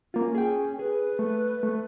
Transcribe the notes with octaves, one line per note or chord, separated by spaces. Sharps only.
A#3 C#4 F4
G#4 G5
G#4 B4
A3
A3